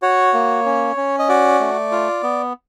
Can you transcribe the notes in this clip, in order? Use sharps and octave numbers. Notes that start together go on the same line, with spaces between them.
F#4 C#5
A#3
C#4
C#4
D#5
F#4 D5
A3
F4
B3